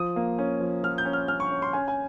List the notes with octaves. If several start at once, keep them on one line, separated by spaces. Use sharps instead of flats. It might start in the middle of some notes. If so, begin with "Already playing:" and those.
Already playing: F3 D#6
A#3
C#4
F3
F3 F6
G6
C#4
F6
C#4 F6
C#6
C#4
C6
C#4 G#5
G#5